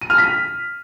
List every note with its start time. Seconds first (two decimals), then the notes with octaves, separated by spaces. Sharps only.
0.01 D#7
0.10 F6
0.18 B6